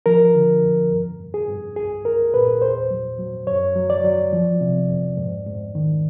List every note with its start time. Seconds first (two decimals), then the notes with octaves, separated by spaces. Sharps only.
0.06 F3 A#4
0.35 D3
0.63 F2
0.92 G2
1.20 G2
1.34 G#4
1.48 G2
1.76 C2 G#4
2.05 C2 A#4
2.33 A#2 B4
2.61 E2 C5
2.91 F#3
3.19 F#3
3.47 F#2 C#5
3.75 F#3
3.90 D5
4.04 F#3
4.33 F3
4.61 C3
4.89 F2
5.17 G#2
5.46 G#2
5.75 D#3